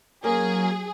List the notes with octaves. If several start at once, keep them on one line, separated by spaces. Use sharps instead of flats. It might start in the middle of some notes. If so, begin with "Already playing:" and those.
F#3 A#3 C#4 G#4 A#4